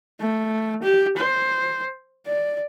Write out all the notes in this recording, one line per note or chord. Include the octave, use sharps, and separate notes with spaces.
A3
G4
C5
D5